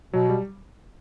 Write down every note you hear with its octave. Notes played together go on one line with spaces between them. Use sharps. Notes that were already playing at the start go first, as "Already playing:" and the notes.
B2 F#3
G3